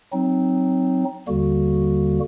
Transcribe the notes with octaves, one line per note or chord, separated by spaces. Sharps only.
F#3 C4 D#4
D#2 D3 G3 A#3 F#4